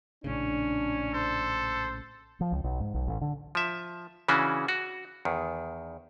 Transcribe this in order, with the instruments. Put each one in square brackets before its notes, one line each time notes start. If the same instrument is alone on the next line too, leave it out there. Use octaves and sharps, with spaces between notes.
[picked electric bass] A#1 A2 C#3 [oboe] C#4 [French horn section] D4
[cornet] A4 [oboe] C5
[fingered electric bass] F3
C#2
B1
G#2
B1
A1
D3
[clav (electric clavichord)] F3 E5
C#3 E3 C#4 D4 F#4
F#4
E2 D#3